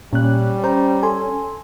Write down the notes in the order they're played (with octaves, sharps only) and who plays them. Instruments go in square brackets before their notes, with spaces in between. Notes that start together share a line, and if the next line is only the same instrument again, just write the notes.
[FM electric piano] A#2 F#6 [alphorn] G3 [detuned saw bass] C#4
[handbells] C5 A#5 [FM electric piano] G5
[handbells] A4 C6 [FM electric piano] G#5